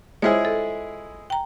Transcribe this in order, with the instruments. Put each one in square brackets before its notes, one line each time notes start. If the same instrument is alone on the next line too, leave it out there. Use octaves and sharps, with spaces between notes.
[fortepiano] G#3 E4 G#4 [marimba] F4 C5 C#5
[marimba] A4
G5 A#5